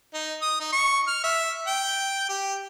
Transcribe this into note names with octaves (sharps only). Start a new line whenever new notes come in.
D#4
D#6
D#4
C#6
F6
E5
G5
G4